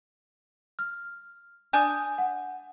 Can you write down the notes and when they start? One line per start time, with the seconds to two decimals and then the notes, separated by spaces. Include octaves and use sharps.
0.79 F6
1.73 D4 G#5 D#6 G6
2.18 F#5